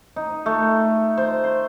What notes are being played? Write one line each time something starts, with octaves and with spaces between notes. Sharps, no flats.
D#4
A3
C5
C6